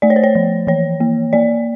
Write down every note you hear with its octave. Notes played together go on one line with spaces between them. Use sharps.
A3 D5
C#5
C5
C#5
F3
E3 C#5
A#3
A#3 D5